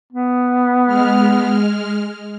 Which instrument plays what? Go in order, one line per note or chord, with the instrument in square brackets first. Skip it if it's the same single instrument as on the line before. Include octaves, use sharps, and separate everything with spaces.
[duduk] B3
[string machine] G#3 F6